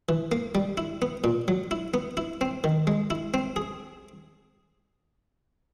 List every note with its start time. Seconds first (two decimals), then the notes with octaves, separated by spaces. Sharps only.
0.09 E3
0.32 A#3
0.55 G3
0.77 E4
1.02 B3
1.24 A#2
1.48 F#3
1.71 E4
1.94 B3
2.17 E4
2.41 C4
2.64 D#3
2.87 G#3
3.10 E4
3.34 C4
3.56 G#4